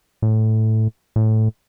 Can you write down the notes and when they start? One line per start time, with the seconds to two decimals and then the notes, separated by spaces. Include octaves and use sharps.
0.22 A2
1.16 A2